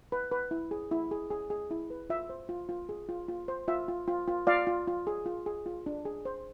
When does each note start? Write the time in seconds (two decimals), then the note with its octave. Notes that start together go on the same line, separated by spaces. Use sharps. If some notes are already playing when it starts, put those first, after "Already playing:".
0.12 B4
0.31 B4
0.51 E4
0.71 G#4
0.91 E4
1.11 G#4
1.31 G#4
1.50 G#4
1.71 E4
1.90 B4
2.10 F4 E5
2.30 C5
2.49 F4
2.69 F4
2.89 G#4
3.09 F4
3.28 F4
3.48 C5
3.68 F4 E5
3.88 F4
4.08 F4
4.28 F4
4.47 F4 D5 F5
4.67 F4
4.87 F4
5.07 G#4
5.26 F4
5.46 G#4
5.66 F4
5.86 D4
6.05 G#4
6.25 C5